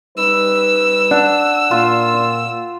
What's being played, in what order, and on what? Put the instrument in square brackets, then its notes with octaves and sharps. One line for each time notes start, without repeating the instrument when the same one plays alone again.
[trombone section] G3 D#4 B4 [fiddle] E6
[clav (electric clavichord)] D4 [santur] F#5
[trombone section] A#2 [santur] F4